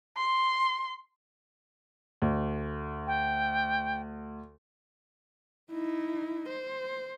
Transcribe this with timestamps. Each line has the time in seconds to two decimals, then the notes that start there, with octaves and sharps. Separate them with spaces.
0.17 C6
2.22 D2
3.07 G5
5.71 D#4 E4
6.48 C5